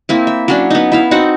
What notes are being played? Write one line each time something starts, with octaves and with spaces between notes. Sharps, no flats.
A#3 C4 E4
E5
F#3 C#4 D4
B3 D#4
E4 E5 F5
C4 D#4 F#4 F#5